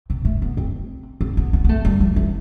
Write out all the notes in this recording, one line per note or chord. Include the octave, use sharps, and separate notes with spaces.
C3
A3
B3
C4
C4
B3
B3
B3
A3
G3
F3
E3